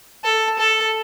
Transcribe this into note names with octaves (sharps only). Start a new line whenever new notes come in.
A4
A4